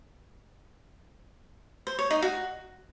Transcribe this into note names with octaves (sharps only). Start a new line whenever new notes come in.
C5
C#5
D#4
F#4